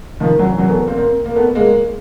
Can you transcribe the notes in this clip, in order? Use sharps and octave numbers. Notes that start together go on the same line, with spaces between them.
D#3 F3
E3 F#3
E3 F#3
A3 B3
A#3 C4
A#3 C4
A#3
A3 B3
G#3 A#3